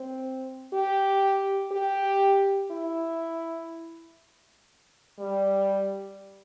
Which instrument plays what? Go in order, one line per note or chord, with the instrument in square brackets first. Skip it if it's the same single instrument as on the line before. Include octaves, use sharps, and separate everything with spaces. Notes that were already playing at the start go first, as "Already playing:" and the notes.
Already playing: [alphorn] C4
G4
G4
E4
G3